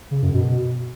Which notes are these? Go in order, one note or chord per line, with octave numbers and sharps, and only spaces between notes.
C#3
F#2
B2